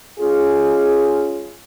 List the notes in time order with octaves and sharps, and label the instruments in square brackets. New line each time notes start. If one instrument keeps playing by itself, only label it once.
[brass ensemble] G#3 C#4 F4 G#4